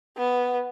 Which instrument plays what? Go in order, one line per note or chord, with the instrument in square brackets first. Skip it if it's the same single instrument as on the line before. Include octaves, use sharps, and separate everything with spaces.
[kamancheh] B3